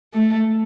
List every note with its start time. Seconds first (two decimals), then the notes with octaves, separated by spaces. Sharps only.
0.13 A3